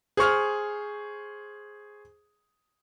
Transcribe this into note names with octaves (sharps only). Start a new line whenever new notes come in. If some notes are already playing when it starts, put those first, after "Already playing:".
G#4 C5 C#6 F6